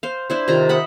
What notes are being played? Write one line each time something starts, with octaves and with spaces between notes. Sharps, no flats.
C5 F5
D4 E4 C5
C3 D#3 F4 A#5
D#5 E5 F#5 B5